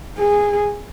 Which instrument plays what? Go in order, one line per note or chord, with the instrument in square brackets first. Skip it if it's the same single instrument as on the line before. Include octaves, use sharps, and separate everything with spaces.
[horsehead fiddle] G#4